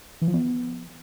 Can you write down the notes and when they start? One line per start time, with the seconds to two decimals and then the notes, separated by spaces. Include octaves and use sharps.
0.22 E3
0.28 F3
0.34 B3